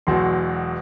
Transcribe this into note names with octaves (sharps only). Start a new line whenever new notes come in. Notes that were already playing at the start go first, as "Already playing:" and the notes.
E1 E2 B2 F#3 C6